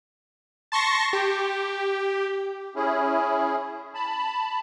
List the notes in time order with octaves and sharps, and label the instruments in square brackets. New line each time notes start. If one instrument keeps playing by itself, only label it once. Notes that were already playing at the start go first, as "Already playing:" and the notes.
[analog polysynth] A5 C6 C#6 A#6
G4
[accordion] C#4 E4 G#4
A5 B5